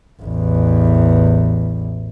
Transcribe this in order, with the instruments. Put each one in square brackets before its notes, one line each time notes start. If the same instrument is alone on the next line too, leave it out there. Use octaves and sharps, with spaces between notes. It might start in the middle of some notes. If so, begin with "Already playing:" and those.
[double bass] A1 E2